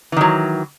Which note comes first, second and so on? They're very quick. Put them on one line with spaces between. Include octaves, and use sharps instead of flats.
E3 D#3 F#3